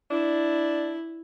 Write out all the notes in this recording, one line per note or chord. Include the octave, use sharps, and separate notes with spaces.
D4 E4